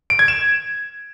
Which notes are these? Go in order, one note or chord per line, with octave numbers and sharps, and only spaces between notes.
D7
G#6
E7